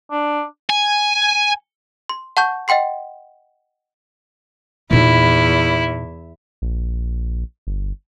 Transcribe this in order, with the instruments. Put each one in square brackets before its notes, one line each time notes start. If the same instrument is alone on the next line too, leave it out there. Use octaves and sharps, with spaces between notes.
[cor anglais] D4
[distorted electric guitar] G#5
[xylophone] C6
F#5 A5 C#6 G6
D#5 F#5 G5 C6 C7
[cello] E2 [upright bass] A#2 D#4 [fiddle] E4
[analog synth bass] A#1
G1